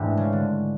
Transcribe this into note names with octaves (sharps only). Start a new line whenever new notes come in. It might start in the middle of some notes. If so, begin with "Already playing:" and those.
Already playing: G#2 E3 A3 D4 G4
C#3
D3